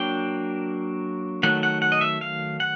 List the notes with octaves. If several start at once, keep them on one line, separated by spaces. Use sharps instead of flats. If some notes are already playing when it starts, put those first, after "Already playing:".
Already playing: F#3 A#3 D4 G5
D#3 F#3 A3 F#5
F#5
F#5
D#5
E5
F5
F#5